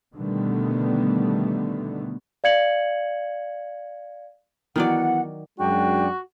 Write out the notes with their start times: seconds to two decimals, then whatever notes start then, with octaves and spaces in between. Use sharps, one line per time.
0.15 B2 D3 D#3 G3 A3 B3
2.44 D5 F5 G#6 C#7 F#7
4.76 D#3 E3 F#3 B3 D5 F#5
5.59 F#2 G#3 D4 F#4 G5